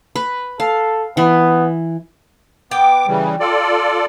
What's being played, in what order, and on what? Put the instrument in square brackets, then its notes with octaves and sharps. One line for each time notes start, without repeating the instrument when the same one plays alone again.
[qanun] B4
[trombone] A4 [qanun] F5
[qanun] E3 [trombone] B3
[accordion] B3 D6 [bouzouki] G5
[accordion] C#3 E3 G3
F4 A4 D5